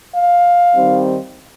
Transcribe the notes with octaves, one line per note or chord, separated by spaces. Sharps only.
F5
D#3 G3 C4 D#4